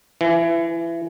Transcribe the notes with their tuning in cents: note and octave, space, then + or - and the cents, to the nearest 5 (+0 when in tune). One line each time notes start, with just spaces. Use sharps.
E3 +25